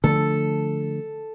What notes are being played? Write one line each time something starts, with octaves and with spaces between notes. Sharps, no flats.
D3 F3 A3 D4 A4